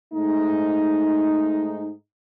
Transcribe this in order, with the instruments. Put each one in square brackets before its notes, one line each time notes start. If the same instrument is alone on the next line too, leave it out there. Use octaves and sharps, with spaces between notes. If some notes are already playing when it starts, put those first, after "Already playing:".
[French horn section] G#2 A3 D#4